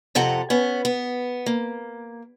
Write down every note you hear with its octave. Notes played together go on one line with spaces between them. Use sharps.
F2 C3 A4 F#5 A#5
B3 C#4
B3
A#3